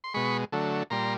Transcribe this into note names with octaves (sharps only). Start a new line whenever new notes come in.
C6
B2 G#3 B5 C#6
D3 F#3 A3
A#2 G3 A#5 C6